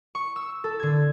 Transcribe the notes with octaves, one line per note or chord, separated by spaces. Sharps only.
C#6
E6
A4
D3 G#6